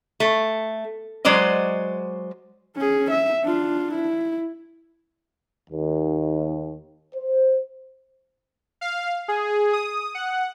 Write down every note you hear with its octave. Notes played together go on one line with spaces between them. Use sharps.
A3
F#3 G#3 C5 D5 D#5
C#4 G#4
E5
D4 F4
E4
D#2
C5
F5
G#4
D#6
F#5